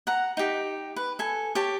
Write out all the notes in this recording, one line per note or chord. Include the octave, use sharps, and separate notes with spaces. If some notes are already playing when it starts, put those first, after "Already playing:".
F#5 A#5
D#4 G4
B4
A4 G#5
G4 C#5 A5